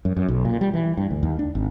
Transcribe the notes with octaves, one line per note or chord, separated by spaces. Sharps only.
F#2
F#2
B1
A#2
G3
E3
G2
D2
D#2
D4
G#1